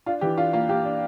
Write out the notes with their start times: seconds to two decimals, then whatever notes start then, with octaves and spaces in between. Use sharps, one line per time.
0.06 D4 F4
0.21 E3 G4
0.37 D4 F4
0.53 A#3 F4
0.69 A#3 G4
0.85 D4